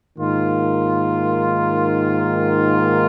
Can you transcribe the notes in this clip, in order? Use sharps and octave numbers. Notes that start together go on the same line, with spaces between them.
G#2 D#3 A#3 F4